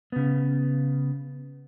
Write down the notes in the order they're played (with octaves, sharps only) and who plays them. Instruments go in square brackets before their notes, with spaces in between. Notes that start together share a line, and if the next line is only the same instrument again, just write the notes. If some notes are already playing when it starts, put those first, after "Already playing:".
[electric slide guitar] C#3 B3